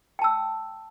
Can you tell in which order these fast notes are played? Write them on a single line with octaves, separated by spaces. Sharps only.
G5 A5 E6